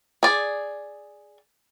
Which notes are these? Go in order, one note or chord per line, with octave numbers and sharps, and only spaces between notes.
G#4 D5